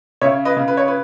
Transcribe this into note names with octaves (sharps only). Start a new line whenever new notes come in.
C#3 C#5 E5
B4 D#5
C#3
B4
C#5
B4